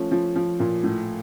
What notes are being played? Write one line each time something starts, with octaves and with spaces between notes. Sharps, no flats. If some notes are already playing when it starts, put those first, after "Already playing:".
Already playing: F3 A3 C#4
F3
F3
A#2
A2